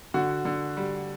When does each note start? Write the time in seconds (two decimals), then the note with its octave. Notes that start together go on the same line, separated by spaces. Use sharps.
0.14 D3 F#4
0.45 D3
0.77 G3